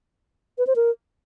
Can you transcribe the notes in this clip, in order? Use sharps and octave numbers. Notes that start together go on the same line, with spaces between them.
B4
C5
A#4